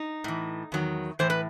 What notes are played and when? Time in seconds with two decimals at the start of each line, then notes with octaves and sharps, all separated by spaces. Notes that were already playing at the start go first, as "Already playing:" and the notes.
Already playing: D#4
0.24 A2 E3
0.72 E2 D#3 F#3
1.19 A2 E3 C5
1.30 B4